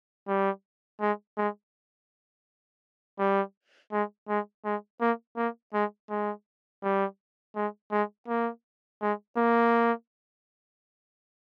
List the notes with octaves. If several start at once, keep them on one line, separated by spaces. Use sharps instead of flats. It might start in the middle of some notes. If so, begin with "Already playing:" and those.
G3
G#3
G#3
G3
G#3
G#3
G#3
A#3
A#3
G#3
G#3
G3
G#3
G#3
A#3
G#3
A#3